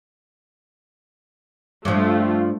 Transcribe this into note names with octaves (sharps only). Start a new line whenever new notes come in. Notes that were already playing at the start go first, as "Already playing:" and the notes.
G2 F3 A3 F4